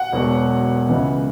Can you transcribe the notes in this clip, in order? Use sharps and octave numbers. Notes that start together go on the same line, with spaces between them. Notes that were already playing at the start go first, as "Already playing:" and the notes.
Already playing: F#5
E1 E2 B2 F#3
C#2 C#3 E3